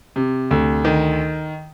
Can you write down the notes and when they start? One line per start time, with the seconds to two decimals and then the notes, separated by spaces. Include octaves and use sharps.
0.16 C3
0.51 D2
0.85 D#3